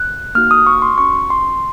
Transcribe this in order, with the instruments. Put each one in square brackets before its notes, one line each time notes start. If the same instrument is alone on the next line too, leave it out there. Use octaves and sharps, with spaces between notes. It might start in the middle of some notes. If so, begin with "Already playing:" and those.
Already playing: [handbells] F#6
A#3 D#4 F#4 F6
D#6
C#6
C6
C#4 F#4 C#6
C6